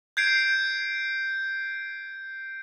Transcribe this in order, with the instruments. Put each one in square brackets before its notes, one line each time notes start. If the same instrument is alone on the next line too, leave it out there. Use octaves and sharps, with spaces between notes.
[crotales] G6 G#6 C7 D7